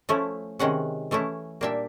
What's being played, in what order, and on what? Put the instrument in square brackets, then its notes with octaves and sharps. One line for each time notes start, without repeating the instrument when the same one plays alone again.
[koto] F3 A3 C#4 E4
C3 D#3 G#3 C#4 F#5
E3 A3 C#4 E4
A#2 G3 A#3 D4 E5